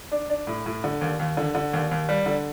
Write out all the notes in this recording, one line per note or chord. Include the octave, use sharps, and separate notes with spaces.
D4
D4
A2
A2
D3
D#2
D#2
D3
D3
D#2
D#2
G3
D3